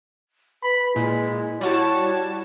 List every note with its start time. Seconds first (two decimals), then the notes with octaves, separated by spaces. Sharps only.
0.63 B4 B5
0.96 A#2 G#3 E4
1.61 G3 E4 F#4 C#5 A5